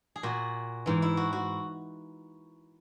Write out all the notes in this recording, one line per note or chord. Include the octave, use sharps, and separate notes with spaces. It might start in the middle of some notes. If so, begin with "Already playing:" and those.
G#4
A#2 F#4
G#2 E3
E4
F#4
F#4